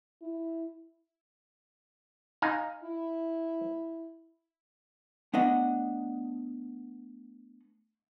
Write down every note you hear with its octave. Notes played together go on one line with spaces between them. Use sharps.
E4
D#4 F5 G#5
E4
A3 B3 D4 D#5 F#5